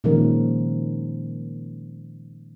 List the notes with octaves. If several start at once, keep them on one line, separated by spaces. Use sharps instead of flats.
A#2 D#3 F3 G#3 C#4 A#4